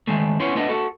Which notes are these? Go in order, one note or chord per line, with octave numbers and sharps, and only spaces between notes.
D#3 G#3 A3
B3 C#4 E4 C#5 C6
A3 B3 D4 D#5
F#4 A4